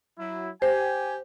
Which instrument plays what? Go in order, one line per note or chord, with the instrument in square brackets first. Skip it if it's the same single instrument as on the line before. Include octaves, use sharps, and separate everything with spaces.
[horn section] F#3 E4
[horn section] G4 G#5 [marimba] C5